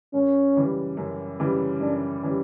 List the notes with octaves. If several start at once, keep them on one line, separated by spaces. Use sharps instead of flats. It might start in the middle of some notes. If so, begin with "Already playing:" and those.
F#2 C#4
C#3 E3 G3
F#2
C#3 E3 G3
F#2 D4
C#3 E3 G3